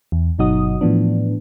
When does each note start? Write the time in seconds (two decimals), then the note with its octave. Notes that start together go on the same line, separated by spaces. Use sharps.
0.12 E2
0.39 G1 B2 F#3 D#4 F#4 D#6
0.81 A2 E3 F3 B3 D4